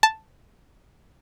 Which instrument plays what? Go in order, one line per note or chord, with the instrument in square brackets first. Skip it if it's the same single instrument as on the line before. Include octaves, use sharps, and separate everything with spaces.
[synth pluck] A5